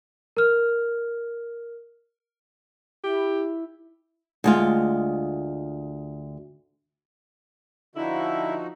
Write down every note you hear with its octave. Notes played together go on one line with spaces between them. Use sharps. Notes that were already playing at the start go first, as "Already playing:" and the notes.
A#4 F6
E4 G4
D2 G#3 F4
D3 F3 D#4 E4 F#4